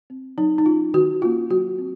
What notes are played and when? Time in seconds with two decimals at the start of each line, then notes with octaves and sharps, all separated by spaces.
0.10 C4
0.38 F#3 D#4
0.58 D#4
0.66 C#4 F4
0.94 D#3 F#4
1.22 A#3 C#4 F4
1.50 F#3 F#4
1.79 C4